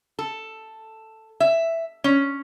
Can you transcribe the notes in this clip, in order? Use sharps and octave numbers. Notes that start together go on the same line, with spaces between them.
A4
E5
C#4